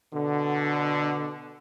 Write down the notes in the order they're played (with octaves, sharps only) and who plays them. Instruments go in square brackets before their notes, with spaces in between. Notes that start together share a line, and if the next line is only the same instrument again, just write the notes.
[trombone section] B2 D3